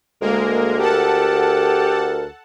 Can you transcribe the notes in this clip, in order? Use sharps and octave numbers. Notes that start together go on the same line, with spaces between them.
D2 G#3 A#3 A#4
G4 A4 A#4 F#5 A5